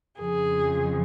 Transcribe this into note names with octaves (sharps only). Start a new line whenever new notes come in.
F2 C#3 F3 G#4